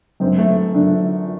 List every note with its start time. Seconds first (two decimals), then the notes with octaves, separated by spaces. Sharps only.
0.20 F#2 D3 C4
0.38 A3
0.75 F#2 D3 D4